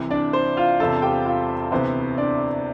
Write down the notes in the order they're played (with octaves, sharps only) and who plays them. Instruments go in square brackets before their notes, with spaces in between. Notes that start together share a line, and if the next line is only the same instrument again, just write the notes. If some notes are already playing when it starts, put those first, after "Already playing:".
Already playing: [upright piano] C2 C3 E3
[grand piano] D4 D5
C5
F4 F5
[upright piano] E1 E2 C3 [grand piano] A4 A5
[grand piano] G4 G5
F4 F5
[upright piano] D2 C3 E3 B3 [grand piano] C5
[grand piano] D4 D5